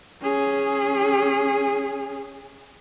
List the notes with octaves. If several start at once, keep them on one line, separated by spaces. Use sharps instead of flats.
C#4 G#4